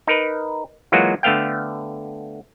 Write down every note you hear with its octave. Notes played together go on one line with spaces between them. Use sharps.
D#4 A#4 B4
E3 F#3 G#3 A#3 F4 F#4
D3 A3 B3 F5 G5